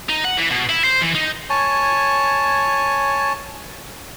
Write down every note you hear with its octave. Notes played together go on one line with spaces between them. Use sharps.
D#4
F#5
E3
B2
E4
C5
E3
D#4
C#5 G#5 A5